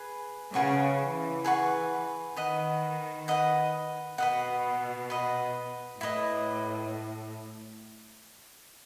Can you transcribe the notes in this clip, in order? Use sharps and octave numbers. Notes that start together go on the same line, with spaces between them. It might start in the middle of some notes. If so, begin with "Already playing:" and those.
Already playing: G#4 B4
C#3 G#4 B4 F#5 C#6
E3
G#4 B4 F#5 C#6
D#3 B4 D#5 F#5
B4 D#5 F#5
B2 B4 D#5 F#5
B4 D#5 F#5
A2 E4 B4 D#5